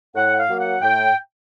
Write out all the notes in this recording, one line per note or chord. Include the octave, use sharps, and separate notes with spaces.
A2 F#5
F5
F#3 A#3
F#5
A2 G5